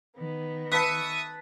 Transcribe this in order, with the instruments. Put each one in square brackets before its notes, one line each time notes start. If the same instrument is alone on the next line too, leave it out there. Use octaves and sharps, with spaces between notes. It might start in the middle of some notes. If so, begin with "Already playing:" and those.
[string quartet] D#3 B3
[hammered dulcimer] B4 A5 [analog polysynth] E5 C#6 D#6